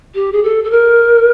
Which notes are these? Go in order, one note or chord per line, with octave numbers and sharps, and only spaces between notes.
G4
G#4
A4
A4
A#4